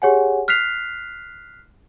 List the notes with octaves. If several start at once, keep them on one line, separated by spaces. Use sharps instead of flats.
G4 G#4 C#5 F#5 G#5
F6 F#6 B6 C7 F7